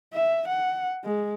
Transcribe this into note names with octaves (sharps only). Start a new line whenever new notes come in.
E5
F#5
G#3